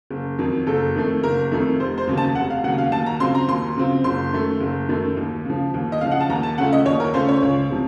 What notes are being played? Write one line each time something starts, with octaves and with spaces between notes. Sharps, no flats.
F#1
F2 D#3 F#3
F#1 A4
F2 D#3 A3
F#1 A#4
F2 D#3 A3
F1 C5
C5
D#2 C#3 F#3
A5
F1 F#5
F5
D#2 C#3 F#3 F#5
F5
D#2 A5
A#5
C#3 F#3 C4 F4 C6
A#5
D#2 C6
C#3 F#3 C4 F4
F#1 C6
F#2 D#3 F#3 A3
F#1
F#2 D#3 F#3 A3
D#2
C#3 F3
D#2
D#5
C#3 F3 F5
F#5
A5
D#2 A#5
A5
C#3 A3 C#4 F4 F#5
D#5
D#2 C#5
A#4
C#3 A3 C#4 F4 C5
C#5
C#2
C3 F3